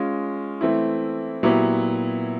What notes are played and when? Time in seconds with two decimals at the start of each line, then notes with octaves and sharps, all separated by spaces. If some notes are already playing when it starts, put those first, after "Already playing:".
Already playing: G#3 C#4 F4
0.61 E3 A3 C4 E4
1.43 A#2 F#3 B3 E4 G4